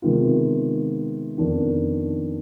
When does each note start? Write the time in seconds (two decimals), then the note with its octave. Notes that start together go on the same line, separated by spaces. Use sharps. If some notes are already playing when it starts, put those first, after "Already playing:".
0.02 C3 D#3 G#3 B3 F4
1.38 F2 D#3 B3 D4